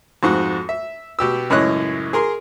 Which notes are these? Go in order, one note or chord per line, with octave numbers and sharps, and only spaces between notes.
F2 G#2 F#4
E5
B2 G4 E6
C#2 F#2 A2 C#5 D#5 F#6
G#4 A#4 C6